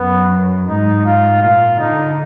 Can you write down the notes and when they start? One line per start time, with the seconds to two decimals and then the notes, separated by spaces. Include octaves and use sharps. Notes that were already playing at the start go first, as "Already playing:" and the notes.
Already playing: F#2 B3
0.67 G#2 D#4
1.05 F4
1.42 A#2 F4
1.79 D3 D#4